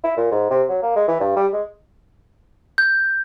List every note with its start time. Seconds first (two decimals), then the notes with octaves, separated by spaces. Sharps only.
0.04 E4
0.17 A#2
0.31 G#2
0.50 C3
0.69 F#3
0.82 A#3
0.96 G#3
1.08 E3
1.20 G2
1.36 G3
1.53 G#3
2.78 G6